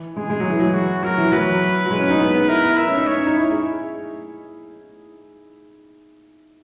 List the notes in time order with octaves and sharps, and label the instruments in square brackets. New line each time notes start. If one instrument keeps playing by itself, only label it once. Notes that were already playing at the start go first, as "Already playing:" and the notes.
Already playing: [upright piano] E3
[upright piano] G#3 [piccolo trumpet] G#4
[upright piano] G#3
F#3
E3
F#3
[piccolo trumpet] F#4
[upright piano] F#3 [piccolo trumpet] A#4
[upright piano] E3
[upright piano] F#3 [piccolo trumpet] B4
[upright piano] F#3
G#3
C#4
D#4
B3
B3
[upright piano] E4 [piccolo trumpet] A#4
[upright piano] E4
[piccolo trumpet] E5
[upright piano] C#4
D#4
[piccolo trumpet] C#5
[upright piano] C#4
D#4
E4
G#4